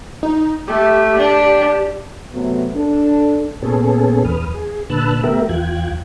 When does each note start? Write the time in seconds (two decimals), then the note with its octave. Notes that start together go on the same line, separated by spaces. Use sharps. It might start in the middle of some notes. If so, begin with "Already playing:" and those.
0.23 D#4
0.68 A3 G4
1.18 D4
2.33 C3 F#3 A3 B3
2.74 D4 A4
3.62 A#2 B3 C#4 G#4 A4
4.24 E2 B4 D#6 F6
4.54 G#4
4.90 A#2 D3 B4 A5 E6 F#6
5.24 A3 B3 G4 A#4 E5
5.49 E2 F4 G5 F#6 G#6